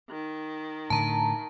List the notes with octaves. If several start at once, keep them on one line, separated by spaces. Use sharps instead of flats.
D#3
A2 D3 A5 A#5